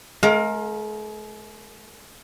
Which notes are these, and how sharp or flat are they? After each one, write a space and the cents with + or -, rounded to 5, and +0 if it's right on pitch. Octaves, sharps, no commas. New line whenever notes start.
G#3 +45 A#4 +0 F5 +30